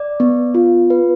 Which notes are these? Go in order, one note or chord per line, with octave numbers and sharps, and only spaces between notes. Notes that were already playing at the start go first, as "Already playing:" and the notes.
Already playing: D5
B3
F4
B4